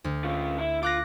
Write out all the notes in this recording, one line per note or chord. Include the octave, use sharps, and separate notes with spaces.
D2
C#4 F4
E4
F4 D6 F#6 A#6